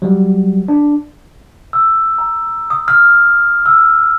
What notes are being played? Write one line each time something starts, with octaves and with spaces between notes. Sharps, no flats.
F#3 G3
D4
E6
A#5
D#6
F6
E6